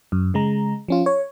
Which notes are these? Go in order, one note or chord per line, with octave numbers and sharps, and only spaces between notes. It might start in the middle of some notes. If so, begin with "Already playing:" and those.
F#2
C#3 G#3 A#5
F3 C#4 F4
C#5